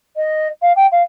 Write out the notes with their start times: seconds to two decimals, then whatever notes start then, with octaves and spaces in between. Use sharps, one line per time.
0.17 D#5
0.62 F5
0.76 G5
0.92 F5